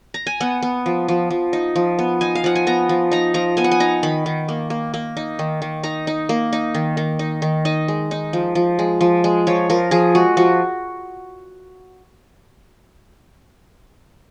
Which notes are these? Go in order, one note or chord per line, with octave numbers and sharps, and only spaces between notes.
A#5
G#5
B3 F#5
B3
F3
F3
F3
D#4
F3
B3
D#4 G#5
F5
F3 F#5
G#5
B3 A#5
F3
D#4 A#5
F3 A#5
B3 G#5
F#5
G#5
D#4 A#5
D#3 B5
D#3
A#3
A#3
A#3
D#4
D#3
D#3
D#4 A#5
D#4
A#3
D#4
D#3
D#3
D#4
D#3
D#4 D#5
G#3
D#4
F3
F3
G#3
F3
G#3
F3 C#5
F3 A#4
F3 G#4
G#3 F#4
F3 F#4